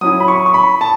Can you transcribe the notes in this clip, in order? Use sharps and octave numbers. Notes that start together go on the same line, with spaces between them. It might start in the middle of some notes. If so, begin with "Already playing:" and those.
F#3 C#4 E4 D#6
B5
C#6
C#6
B5
A5